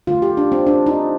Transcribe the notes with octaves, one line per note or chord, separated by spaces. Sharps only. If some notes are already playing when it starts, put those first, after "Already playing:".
D3 A3 F4
G4
D4
C4
D4
D#4